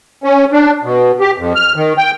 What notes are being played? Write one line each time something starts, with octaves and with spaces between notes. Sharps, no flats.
C#4
D4
B2
G4
F2
F6
D#3
G5